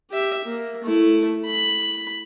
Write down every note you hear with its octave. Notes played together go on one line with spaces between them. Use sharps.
G4 E5
A#3
A3 E4
B5